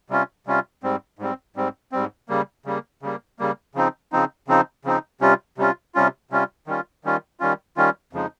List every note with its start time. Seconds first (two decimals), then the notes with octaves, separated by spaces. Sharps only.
0.10 C3 G3 C#4 F4
0.47 C3 G3 C#4 F4
0.83 G#2 G3 C4
1.19 G#2 G3 C4
1.56 G#2 G3 C4
1.92 G#2 G3 C4
2.28 C#3 G3 A#3
2.65 C#3 G3 A#3
3.02 C#3 G3 A#3
3.39 C#3 G3 A#3
3.75 C#3 F3 C4 D#4
4.12 C#3 F3 C4 D#4
4.48 C#3 F3 C4 D#4
4.85 C#3 F3 C4 D#4
5.21 C3 G3 C#4 F4
5.58 C3 G3 C#4 F4
5.95 C3 G3 C#4 F4
6.30 C3 G3 C#4 F4
6.67 D#3 G3 C#4 F4
7.04 D#3 G3 C#4 F4
7.40 D#3 G3 C#4 F4
7.77 D#3 G3 C#4 F4
8.13 F2 C#3 F3 G#3 D#4